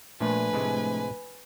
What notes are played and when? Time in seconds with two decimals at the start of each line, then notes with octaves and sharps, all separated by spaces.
0.20 A#2 F3 A3 D4 B4 G#5
0.53 A2 C3 G#3